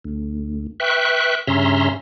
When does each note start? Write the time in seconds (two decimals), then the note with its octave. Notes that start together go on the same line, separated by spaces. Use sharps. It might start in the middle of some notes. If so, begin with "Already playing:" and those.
0.04 D2
0.80 B4 E5 G5 C#6 F#6
1.47 G2 C#3 C#4 E5 A#5 C6